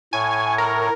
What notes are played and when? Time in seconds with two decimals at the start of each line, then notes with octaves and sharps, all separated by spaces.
0.13 A2 C#5 G#5
0.58 A#4